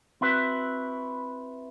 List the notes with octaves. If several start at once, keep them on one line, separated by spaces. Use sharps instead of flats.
C4 E4 F#4 B4 E5